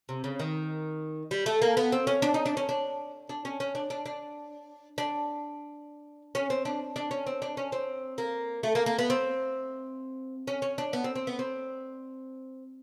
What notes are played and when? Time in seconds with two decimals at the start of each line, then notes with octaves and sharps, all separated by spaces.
0.09 C3
0.24 C#3
0.39 D#3
1.31 G3
1.46 A3
1.62 A#3
1.77 B3
1.92 C4
2.07 C#4
2.22 D4
2.34 D#4
2.46 D4
2.57 C#4
2.69 D4
3.29 D4
3.45 C#4
3.60 C#4
3.75 D4
3.90 D4
4.06 D4
4.98 D4
6.35 C#4
6.50 C4
6.65 D4
6.96 D4
7.11 C#4
7.27 C4
7.42 D4
7.57 C#4
7.72 C4
8.18 A#3
8.63 A3
8.75 A#3
8.86 A#3
8.99 B3
9.10 C4
10.47 C#4
10.62 C#4
10.78 D4
10.93 B3
11.04 C4
11.15 C4
11.27 B3
11.39 C4